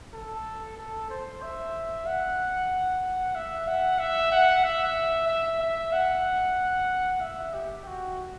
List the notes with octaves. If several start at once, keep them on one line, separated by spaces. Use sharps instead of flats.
A4
A4
C5
E5
F#5
E5
F#5
E5
F#5
E5
E5
E5
F#5
E5
G4
F#4